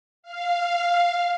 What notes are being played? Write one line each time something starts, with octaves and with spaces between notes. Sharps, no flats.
F5